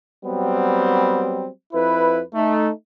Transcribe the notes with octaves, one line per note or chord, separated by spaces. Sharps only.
F#3 G3 B3 C4
F2 E4 B4
A3 D#4